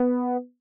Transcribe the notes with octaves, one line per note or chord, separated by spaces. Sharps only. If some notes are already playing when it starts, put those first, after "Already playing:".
Already playing: B3